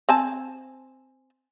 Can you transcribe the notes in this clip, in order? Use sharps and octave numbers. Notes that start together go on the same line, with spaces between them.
C4 G#5 A5